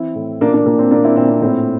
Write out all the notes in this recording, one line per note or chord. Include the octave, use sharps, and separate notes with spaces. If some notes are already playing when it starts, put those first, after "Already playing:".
Already playing: E3 C4 E4
A2
A#2 A#3 D4
A#3 D4
A#2 A#3
C4
A#2 A#3 D4
C4 E4
A#2 C4
C4
A2 C4 E4